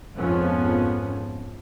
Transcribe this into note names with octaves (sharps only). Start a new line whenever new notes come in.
F2 G#2 F3 B3 C#4